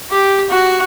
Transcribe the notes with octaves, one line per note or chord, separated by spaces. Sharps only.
G4
F#4